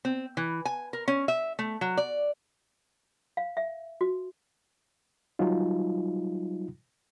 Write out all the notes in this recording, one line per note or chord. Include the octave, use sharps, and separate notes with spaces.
C4
E3
G#5
A#4
C#4
E5
A3
F#3
D5
F5
E5
F#4
F#3 G3 D#4 F4